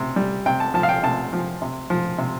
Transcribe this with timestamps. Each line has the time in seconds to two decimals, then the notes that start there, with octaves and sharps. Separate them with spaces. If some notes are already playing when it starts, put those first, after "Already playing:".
Already playing: C3
0.16 G3
0.46 C3 G5
0.60 A5
0.74 F3 A5
0.83 F5
0.89 G5
1.03 C3 A5
1.33 F3
1.62 C3
1.90 F3
2.18 C3